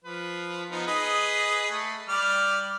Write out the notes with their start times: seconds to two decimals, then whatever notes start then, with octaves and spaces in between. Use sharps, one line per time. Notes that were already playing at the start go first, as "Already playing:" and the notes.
0.04 F3 B4
0.70 F3 B3 D#4
0.87 G#4 B4 D#5
1.71 A3
2.09 G3 D5 F6